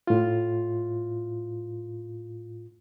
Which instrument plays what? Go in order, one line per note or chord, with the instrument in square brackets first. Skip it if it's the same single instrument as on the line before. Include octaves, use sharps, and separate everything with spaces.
[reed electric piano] A2 F4